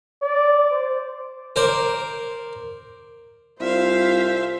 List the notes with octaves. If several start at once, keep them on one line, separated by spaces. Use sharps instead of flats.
D5
C5
A#4 C5 D5
C2 E4 F4 C5 E5 F5